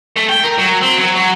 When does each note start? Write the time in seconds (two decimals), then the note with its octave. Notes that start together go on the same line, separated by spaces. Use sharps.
0.16 A3
0.29 G5
0.43 A#4
0.58 F#3
0.81 C4
0.99 F#3
1.16 F#3